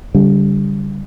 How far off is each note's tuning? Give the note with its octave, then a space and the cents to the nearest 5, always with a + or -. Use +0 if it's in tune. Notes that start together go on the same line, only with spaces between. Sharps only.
D3 -40 G3 +0